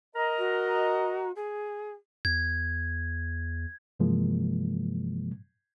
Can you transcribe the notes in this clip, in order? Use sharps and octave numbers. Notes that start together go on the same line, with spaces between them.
A#4 D#5 A#5
F#4
G#4
E2 G#6
G2 C3 E3 F3 G#3 A#3